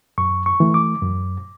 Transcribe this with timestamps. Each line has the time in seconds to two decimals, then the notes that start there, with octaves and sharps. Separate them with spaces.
0.18 F#2 C#6
0.46 C#6
0.60 E3 A3
0.74 D6
1.02 F#2